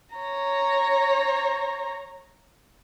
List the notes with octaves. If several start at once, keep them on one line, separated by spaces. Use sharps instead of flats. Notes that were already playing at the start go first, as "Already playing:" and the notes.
C#5 A#5